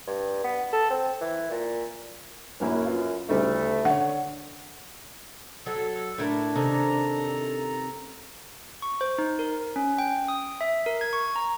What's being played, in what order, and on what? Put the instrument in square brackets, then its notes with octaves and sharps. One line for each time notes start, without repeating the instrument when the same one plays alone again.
[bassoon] G2
B3
A4
C4
E3
A#2
[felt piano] A#1 A#3 E4 [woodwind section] F#2
[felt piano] F4 B4 F5
[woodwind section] D2 A3 [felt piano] C#3 G3 D#4
[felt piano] D3 C#5 [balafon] F#5
[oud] F#3 [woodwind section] A4
[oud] A2 E4 A#4 [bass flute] D4
[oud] C3 D#3 C#4 [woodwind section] A4 A#5
[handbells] C#6
C5
D#4
A#4
C#4
G5
D#6
E5
A#4
G#6
C#6
A#5